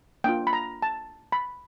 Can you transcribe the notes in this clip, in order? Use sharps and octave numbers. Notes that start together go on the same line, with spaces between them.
A#3 D4 F4 G5
B5
A#5
A5
B5